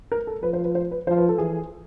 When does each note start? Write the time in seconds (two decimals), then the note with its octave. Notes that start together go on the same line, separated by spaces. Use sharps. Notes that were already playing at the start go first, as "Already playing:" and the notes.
0.12 A#4
0.27 A4
0.43 F3 B4
0.53 C5
0.64 B4
0.75 C5
0.91 B4
1.07 F3 C5
1.18 B4
1.29 A4
1.38 E3 G#4